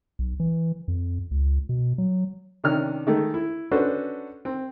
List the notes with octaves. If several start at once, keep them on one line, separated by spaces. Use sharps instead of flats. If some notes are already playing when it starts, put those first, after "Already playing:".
B1
E3
F2
C#2
B2
F#3
C3 D#3 C#4 D4 F6
D#3 G#3 A3
E4
C#4 D4 F#4 A4 B4 C5
C4